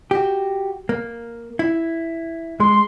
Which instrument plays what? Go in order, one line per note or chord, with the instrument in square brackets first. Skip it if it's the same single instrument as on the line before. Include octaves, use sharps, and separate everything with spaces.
[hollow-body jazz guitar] F#4 G4
A#3
E4
[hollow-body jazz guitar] G#3 [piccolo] C6